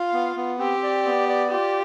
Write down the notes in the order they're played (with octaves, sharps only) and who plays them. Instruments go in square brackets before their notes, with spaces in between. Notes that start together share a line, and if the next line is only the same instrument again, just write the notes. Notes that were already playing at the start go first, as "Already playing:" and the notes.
Already playing: [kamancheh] F4 [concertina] F5
[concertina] B3
B3
[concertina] C4 [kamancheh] G4
[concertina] D5
B3
D5
[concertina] F4 [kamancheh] G4